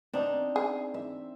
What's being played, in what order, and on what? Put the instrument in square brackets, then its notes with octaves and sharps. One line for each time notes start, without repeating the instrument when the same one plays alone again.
[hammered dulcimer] C4 [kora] D4 D#4
[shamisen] G#4
[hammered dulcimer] E5